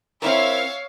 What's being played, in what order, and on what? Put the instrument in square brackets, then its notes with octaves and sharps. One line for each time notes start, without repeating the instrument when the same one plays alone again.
[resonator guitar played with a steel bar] C4 E4 A#4 [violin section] C#5 E5 F5